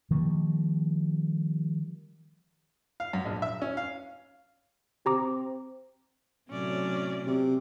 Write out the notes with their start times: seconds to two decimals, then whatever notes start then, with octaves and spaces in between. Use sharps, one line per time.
0.11 D#3 F3 G3 A#3
3.00 F5
3.13 F#2
3.25 A#1
3.42 E5
3.62 C#4
3.77 F5
5.06 C4 G4 A#5 D6
6.50 A2 C3 F#3 C#4 D5
7.26 C3